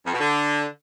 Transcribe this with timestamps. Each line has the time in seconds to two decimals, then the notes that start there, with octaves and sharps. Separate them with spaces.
0.06 F2
0.13 B2
0.20 D3